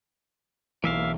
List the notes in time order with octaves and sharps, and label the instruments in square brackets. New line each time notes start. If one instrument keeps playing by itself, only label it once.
[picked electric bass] B1 E3 [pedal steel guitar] A#3 E5 F5